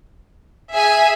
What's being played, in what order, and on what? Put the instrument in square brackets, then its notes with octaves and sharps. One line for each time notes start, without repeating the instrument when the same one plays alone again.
[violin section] G#4 E5 G#5